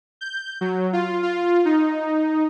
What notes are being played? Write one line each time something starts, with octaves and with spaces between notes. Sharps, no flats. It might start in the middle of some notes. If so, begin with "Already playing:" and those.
G6
F#3
F4
F4
D#4